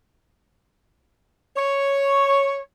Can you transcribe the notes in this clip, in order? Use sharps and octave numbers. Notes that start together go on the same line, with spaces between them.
C#5